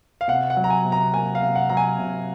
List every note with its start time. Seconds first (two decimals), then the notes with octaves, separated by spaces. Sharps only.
0.21 F5
0.28 C3 F#5
0.50 F#5
0.57 F#3
0.64 A#5
0.70 G#5
0.85 C3
0.92 A#5
1.13 A#3 G#5
1.35 F5
1.42 C3
1.55 F#5
1.69 F#3 A#5
1.77 G#5
1.99 C3